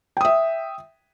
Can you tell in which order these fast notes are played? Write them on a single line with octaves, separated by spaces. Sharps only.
G5 D#6 E5